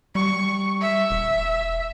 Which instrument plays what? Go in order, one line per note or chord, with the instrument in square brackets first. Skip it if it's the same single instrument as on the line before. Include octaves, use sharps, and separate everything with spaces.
[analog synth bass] G3 [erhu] C#6
[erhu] E5
[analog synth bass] E1